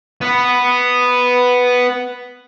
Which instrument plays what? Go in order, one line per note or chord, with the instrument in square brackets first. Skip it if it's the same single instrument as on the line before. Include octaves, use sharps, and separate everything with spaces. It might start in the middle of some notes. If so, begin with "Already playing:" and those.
[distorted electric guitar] B3 B4